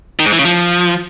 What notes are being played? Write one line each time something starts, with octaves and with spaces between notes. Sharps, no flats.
D#3
G#2
E3
C#3
F3